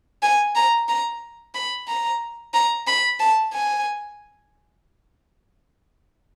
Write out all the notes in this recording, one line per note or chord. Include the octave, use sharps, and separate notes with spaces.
G#5
A#5
A#5
B5
A#5
A#5
B5
A5
G#5